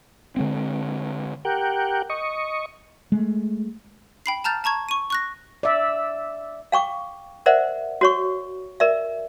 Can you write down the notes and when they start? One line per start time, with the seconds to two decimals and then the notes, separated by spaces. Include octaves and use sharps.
0.36 D3 G#3 C4
1.45 G4 A#4 F#5 G5
2.10 D#5 C#6
3.12 G#3 A3
4.26 G5 B5 C7
4.44 A5 A#5 F6 G6 A6
4.64 A5 A#5 C#6 G#6
4.89 C#6 D#7
5.10 C#6 F#6 A#6
5.63 D5 E5
6.72 F5 G5 C#6 D6
7.46 A#4 C5 D5 E5 F#5
8.01 F#4 C#5 C#6
8.80 A#4 D5 E5